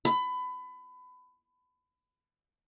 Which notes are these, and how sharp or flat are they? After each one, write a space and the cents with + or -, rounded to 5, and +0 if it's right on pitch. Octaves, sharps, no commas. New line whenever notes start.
B5 +25